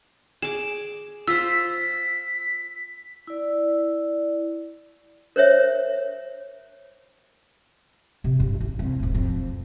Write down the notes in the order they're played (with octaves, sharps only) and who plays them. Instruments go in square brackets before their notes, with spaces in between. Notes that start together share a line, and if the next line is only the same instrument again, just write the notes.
[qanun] G#4 D6 [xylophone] E7
[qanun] F4 C5 [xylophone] E6 [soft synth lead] B6
[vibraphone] E4 D5
[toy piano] A#4 C5 C#5 E5
[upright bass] C3
G2
E4
C2
E1 G#2
F2